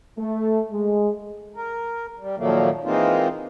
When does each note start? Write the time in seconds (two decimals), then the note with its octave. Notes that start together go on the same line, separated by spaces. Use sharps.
0.18 A3
0.71 G#3
1.56 A#4
2.19 G3
2.38 A#2 D#3 F3 F#3 A3 A#3
2.84 E3 G#3 A#3 C4 D#4 F4